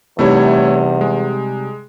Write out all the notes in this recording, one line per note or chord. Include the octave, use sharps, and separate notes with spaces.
E2 C3 G3 A3 D#4 E4 C#5
G#3